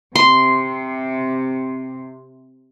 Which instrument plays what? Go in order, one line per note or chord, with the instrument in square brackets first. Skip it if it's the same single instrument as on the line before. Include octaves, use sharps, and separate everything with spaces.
[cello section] C3 [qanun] C6